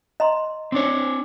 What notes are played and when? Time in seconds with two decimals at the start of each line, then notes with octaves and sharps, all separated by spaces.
0.20 D#5 A#5 C6
0.72 C4 D4 C#5